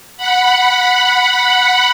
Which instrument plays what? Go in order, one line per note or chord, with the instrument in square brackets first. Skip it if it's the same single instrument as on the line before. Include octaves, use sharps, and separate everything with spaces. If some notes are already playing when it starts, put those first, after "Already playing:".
[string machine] F#5 B5